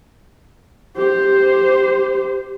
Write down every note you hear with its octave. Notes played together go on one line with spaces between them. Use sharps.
G4 C5